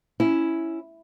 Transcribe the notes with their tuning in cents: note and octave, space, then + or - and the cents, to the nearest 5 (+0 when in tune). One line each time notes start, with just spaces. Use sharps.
C#4 +0 E4 +0